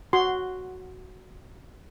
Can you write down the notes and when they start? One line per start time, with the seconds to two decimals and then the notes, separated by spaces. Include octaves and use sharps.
0.13 F#4 C6